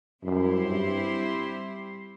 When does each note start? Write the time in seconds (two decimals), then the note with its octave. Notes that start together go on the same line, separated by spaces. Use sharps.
0.23 F#2 G3 C4 E4 G4 C5
0.65 G2